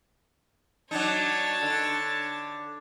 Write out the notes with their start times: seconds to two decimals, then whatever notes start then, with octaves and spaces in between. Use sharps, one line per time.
0.91 F#3 D4 D#4 C#5 A5
1.62 D3